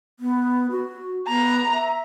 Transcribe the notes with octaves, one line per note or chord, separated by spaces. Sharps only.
B3
F#4
B3 A#5
E5